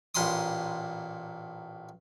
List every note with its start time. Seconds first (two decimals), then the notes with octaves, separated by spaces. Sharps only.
0.15 A1 A#2 B5 C6 D#6